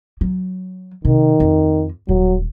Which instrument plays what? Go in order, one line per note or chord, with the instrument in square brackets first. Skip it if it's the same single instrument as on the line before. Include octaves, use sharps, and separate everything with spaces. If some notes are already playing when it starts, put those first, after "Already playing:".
[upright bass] F#3
[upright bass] C3 [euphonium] D#3
[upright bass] F2
[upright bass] D#1 [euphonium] F#3